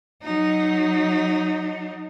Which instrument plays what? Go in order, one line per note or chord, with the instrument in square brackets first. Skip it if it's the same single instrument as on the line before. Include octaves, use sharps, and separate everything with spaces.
[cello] F#3 D#4